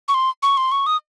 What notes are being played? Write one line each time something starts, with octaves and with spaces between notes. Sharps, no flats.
C#6
C6
C#6
C6
C#6
D#6